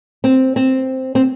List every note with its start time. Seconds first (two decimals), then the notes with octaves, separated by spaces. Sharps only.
0.24 C4
0.56 C4
1.15 C4